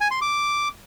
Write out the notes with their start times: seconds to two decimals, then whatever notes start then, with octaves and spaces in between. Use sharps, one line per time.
0.01 G#5
0.11 C6
0.21 D6